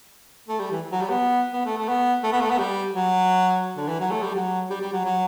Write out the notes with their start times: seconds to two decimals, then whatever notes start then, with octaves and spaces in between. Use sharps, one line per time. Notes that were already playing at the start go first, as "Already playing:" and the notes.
0.48 A3
0.59 G3
0.71 E3
0.92 F#3
1.01 G3
1.09 B3
1.53 B3
1.65 A3
1.77 A3
1.88 B3
2.23 A3
2.32 B3
2.41 A3
2.50 B3
2.58 G3
2.94 F#3
3.77 D3
3.88 E3
3.99 F#3
4.11 A3
4.22 G3
4.35 F#3
4.70 G3
4.81 G3
4.92 F#3
5.05 F#3